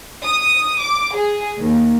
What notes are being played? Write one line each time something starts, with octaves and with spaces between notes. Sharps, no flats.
D#6
D6
G#4
D#2